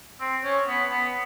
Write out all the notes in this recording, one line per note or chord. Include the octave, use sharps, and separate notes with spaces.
C4
C#4
B3
B3